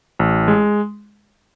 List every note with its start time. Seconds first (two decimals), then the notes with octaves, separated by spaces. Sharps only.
0.19 A1
0.48 G#3